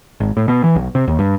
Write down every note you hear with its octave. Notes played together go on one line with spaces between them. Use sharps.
G#1
A2
B2
E3
B1
C3
D#2
G2